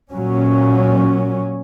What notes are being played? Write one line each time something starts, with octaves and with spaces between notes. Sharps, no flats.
A#2 F#3 C#4